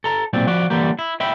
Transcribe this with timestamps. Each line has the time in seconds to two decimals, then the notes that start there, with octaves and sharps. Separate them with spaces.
0.04 A4 A#5
0.33 B1 A#2 C4 D5
0.47 F3 F#4 D5
0.70 D3 E3 G3 A#3 G4
0.99 E4
1.20 D#5 E5 G5 B5